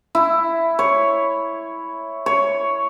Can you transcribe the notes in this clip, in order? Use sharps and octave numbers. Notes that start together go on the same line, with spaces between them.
E4
C#5
C#5